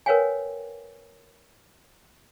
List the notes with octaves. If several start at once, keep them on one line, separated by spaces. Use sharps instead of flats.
A#4 B4 C#5 F5 G5 G#5